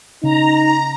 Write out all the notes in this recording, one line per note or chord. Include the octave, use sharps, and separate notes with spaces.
C#3 D#4 A#5